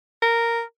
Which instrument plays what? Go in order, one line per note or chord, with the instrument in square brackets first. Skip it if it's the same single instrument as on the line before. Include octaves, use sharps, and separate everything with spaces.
[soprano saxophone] A#4